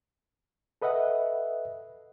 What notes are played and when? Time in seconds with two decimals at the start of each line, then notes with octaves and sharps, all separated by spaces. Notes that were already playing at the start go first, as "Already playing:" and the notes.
0.82 A4 B4 D#5 E5 F#5